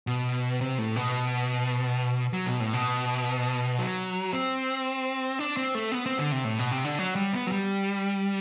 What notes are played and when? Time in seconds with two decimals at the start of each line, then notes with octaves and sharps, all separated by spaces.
0.07 B2
0.61 C3
0.78 A2
0.96 B2
2.33 F#3
2.46 B2
2.60 A2
2.73 B2
3.79 F#3
4.33 C4
5.39 D4
5.57 C4
5.75 A3
5.92 B3
6.06 C4
6.19 D3
6.32 C3
6.44 A2
6.59 B2
6.71 C3
6.84 D3
6.99 F#3
7.16 G3
7.33 B3
7.47 F#3
7.52 G3